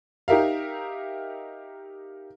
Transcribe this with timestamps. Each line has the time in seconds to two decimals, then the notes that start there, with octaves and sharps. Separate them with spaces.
0.28 D#4 G4 A#4 E5 F5